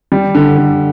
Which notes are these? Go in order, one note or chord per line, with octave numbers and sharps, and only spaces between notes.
G3
D3
D3